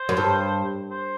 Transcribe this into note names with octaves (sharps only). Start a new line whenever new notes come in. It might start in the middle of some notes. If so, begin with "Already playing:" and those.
Already playing: C5
F#2
G2
C5